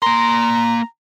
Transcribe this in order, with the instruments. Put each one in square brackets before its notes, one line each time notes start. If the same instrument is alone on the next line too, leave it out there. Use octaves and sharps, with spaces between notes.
[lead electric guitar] A#3 C6 [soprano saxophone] A#5